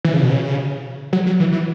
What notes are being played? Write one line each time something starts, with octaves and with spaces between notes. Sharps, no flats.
E3
C#3
B2
C#3
F#3
F#3
E3
E3